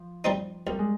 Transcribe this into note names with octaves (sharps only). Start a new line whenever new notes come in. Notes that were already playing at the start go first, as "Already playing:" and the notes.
Already playing: F3
G3 C4 D#4
C2 G3
G#3